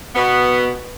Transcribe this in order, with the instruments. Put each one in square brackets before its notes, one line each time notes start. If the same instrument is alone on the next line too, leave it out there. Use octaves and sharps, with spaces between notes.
[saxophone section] B2 B3